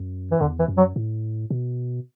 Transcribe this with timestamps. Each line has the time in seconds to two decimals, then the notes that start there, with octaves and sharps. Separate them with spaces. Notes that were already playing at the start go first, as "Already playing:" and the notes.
Already playing: F#2
0.31 E3
0.40 E2 D3
0.59 E3
0.68 F#2
0.77 F#3
0.96 A2
1.50 B2